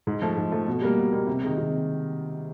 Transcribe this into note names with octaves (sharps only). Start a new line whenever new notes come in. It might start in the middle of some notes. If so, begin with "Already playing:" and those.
G#2
F3 A3
G#2
F3 A3
B2
G3 A#3
B2
G3 A#3
C3
D#3 G#3
C3